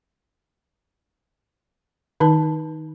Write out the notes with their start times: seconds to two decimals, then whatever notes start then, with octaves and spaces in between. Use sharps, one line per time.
2.20 D#3 D#4 A5